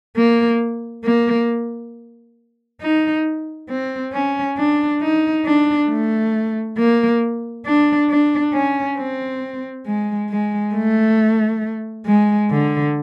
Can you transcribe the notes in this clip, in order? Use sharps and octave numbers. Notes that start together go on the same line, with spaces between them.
A#3
A#3
D#4
C4
C#4
D4
D#4
D4
A3
A#3
D4
D4
C#4
C4
G#3
G#3
A3
G#3
D3